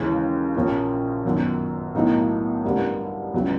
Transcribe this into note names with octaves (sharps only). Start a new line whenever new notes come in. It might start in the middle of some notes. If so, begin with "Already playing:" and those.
Already playing: D#2 C#3 E3 G#3 C#4
A#1 A#2 F3 A#3 C#4
G1 F#2 D#3 F#3
B1 A2 F#3 A#3 D#4
A1 G2 D3 G3 A#3
C#2 C#3 F#3